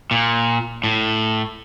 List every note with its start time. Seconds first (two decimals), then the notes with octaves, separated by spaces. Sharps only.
0.11 A#2
0.84 A2